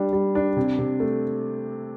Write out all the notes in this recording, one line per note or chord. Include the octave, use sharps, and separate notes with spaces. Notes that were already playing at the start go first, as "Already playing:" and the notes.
Already playing: G3 D4
G3
D4
C3
C3
A3